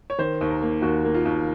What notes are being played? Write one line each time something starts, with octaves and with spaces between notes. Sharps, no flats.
C#5
D#3 C5
D#2
A#4
A#3
D#2 F#4
A#3
F4
D#2